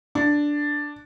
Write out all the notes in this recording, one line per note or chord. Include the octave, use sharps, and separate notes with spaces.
D4